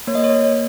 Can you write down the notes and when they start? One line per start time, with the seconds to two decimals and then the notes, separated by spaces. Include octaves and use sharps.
0.07 A#3 C#5
0.15 D#5
0.24 C#5
0.30 A#3